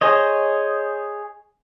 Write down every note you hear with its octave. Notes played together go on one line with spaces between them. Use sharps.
G#4 C5 C#5 D#5